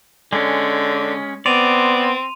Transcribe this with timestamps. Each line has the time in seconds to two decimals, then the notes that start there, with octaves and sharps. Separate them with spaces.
0.33 D3 G#3 C#4
1.46 B3 C4 D5 C6 D#7 F7